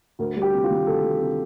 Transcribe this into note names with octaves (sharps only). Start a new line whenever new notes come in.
D2 A#4
G3
G4
C3
F4
D#3
D2 A4
G3
C3